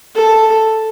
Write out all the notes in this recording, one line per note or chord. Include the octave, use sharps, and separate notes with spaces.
A4